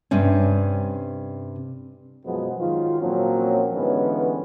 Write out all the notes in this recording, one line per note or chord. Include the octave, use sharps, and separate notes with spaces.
G2 C3 C#4
F#2 B2 F3 F#3 G#3 B3
G#2 D#3 F#3 F4
A#2 F3 F#3 A#3 C4 C#4
G#2 D3 E3 G3 B3 C#4